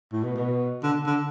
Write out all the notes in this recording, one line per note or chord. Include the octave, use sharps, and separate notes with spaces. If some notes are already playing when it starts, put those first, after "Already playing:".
A2
B2
B2
D3
D3